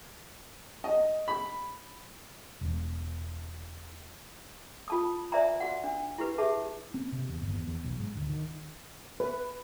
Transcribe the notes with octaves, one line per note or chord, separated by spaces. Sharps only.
D#5
B5
E1 E2
F4 A5 D#6
C5 D5 E5 G#5 A#5
F#4 F#5
D4
E4 G4 B4
G4 G#4 E5 A5
C4
C3
E2
G1
E2
E2
B1
G#2
D2
D#3
B4